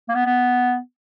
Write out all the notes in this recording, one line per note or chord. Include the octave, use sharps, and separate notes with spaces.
A#3
B3
B3